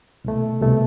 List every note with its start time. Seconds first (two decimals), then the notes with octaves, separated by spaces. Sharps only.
0.24 C2 B2 A3
0.61 C2 B2 A3